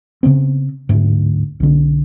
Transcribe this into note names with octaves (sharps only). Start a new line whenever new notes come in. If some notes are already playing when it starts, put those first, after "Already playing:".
C#3 E3 B3 C4
D1 D2 G#2
B1 D3